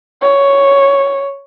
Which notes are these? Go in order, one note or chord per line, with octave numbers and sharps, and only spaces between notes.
C#5